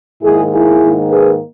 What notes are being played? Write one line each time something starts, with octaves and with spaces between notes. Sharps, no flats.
G#2 D#3 A#3 E4 G#4
E4 G#4
G#2 D#3 A#3
G#4 B4